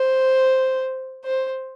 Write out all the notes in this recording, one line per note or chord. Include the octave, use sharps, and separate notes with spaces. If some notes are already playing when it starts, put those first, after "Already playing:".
Already playing: C5
C5